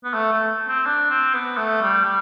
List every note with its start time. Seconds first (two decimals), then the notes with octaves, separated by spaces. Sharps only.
0.04 B3
0.14 A3
0.32 A3
0.68 C4
0.86 D4
1.10 C4
1.34 B3
1.57 A3
1.82 G3
2.05 G3